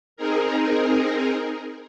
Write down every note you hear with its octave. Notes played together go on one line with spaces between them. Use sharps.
C4 D#4 G#4 A#4